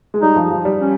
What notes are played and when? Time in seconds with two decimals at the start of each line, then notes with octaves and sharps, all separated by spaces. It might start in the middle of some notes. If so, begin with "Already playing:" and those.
0.14 G#3
0.22 G3 D#4
0.36 F3
0.51 F3
0.65 G3
0.79 C#4